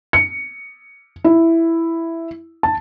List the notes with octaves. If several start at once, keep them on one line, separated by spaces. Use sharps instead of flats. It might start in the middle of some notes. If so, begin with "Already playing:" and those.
C#7
E4
A5